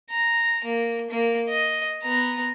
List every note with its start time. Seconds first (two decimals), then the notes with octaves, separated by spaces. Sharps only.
0.10 A#5
0.64 A#3
1.10 A#3
1.49 D#5
2.02 B3 A#5